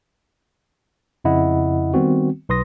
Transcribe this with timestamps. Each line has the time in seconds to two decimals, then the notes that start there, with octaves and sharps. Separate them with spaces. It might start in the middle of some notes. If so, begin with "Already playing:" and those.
1.25 F2 C#3 E4 D#5 F#5
1.94 D#3 G3 B3 C4 F#4
2.49 B1 B4 C6 D#6 A#6